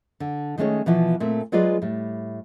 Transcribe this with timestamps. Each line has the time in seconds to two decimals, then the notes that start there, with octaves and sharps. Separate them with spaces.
0.20 D3
0.58 D#3 G#3 A3 C#4 C#5
0.86 B2 E3 F3
1.20 A#2 A3 C4
1.52 F#3 G#3 F4 G#4 B4 D5
1.82 A2 G3